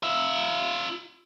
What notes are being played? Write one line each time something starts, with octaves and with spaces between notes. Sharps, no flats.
F4 E5